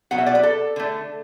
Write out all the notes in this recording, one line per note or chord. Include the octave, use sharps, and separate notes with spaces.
B2 F#3 B3 F#5
E5
D5
B4
A4
D3 A3